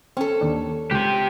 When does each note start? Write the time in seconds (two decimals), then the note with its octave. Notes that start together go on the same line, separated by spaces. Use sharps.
0.17 C4 C#4 A4
0.41 D#2 D4
0.91 C#2 G4 C5